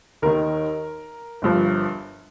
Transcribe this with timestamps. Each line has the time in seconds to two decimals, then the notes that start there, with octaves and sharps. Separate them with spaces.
0.22 D#2 D#3 A#4
1.42 G1 G2 F3